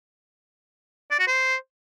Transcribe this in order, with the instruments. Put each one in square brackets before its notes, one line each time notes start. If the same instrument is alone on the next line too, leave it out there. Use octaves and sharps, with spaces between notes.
[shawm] D5
F#4
C5